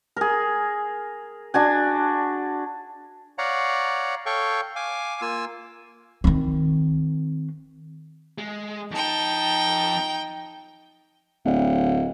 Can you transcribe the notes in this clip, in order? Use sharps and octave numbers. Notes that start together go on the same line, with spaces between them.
G#4 A#4
D4 F#4 G#5
C#5 D5 F5 F#5 A#5
A4 C#5 F5 G5 C#6
F5 G#5 D6
A#3 F4 G#5 E6
D#3 C4
G#3
F2 D#4 G5 A5
D1